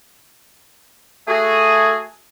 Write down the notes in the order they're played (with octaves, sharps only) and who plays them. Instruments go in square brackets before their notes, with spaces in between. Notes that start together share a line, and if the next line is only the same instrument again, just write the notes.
[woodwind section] A3 F#4 G#4